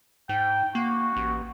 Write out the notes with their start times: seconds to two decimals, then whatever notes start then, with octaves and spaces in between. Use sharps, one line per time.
0.29 G#2 G5
0.75 A#3 F#4
1.16 A1